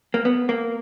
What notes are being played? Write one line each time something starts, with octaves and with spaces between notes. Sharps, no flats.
A#3
B3
A#3